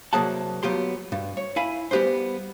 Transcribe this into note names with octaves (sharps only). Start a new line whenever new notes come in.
C2 F#3 A#3 G#4 F#5 A5
F#3 B3 F4 G4 C6
G2
C#5
E4 F5 G#5 B5
G3 B3 G4 B4 C5